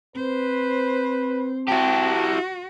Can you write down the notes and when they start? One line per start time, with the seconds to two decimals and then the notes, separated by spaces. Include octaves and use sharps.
0.16 C4 B4 C5
1.68 E4 F#4 G4 A5